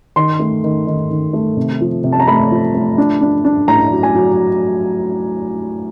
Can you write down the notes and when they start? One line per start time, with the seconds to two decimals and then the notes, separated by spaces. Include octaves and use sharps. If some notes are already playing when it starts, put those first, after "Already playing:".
0.16 D#3 C6
0.39 A3
0.64 D#3
0.87 D#3
1.10 D#3
1.33 A3
1.57 C3
1.81 F3
2.04 C3
2.12 A5
2.20 A#5
2.27 A3 B5
2.51 F3
2.74 A3
2.98 D4
3.21 D4
3.45 D4
3.68 A2 A#5
3.91 F#3
4.03 G#5
4.15 F#3